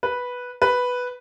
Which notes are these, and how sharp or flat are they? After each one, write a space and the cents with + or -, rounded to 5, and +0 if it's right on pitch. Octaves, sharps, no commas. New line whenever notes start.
B4 -5
B4 +0